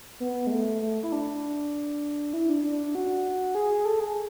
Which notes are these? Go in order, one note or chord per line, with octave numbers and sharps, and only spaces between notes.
B3
G#3
A3
A3
E4
D4
E4
D4
D4
F#4
G#4
A4
G#4